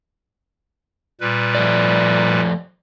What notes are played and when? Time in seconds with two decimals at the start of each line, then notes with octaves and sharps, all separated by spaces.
1.21 A#2 G3 B4
1.55 F3 A3 D5